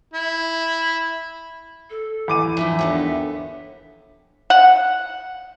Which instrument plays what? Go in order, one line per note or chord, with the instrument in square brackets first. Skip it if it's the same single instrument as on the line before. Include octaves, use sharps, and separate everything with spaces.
[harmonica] E4
[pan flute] A4
[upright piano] E2 D6 D#7
[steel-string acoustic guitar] E3 F3 D#4 [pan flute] E5
[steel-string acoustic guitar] D#2 D3 B3
[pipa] F#5